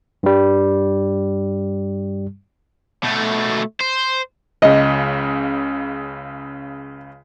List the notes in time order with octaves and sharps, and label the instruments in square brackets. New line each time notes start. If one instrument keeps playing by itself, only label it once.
[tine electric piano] G2 G3
[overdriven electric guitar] B2 A3
C5
[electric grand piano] C#2 C#3 [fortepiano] D#5